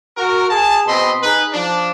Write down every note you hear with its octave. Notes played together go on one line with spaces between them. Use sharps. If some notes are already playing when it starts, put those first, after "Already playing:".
F#4 A#4
G#4 A5
B2 C4 D#5 B5 C6
D#4 G#4 B4
F3 D4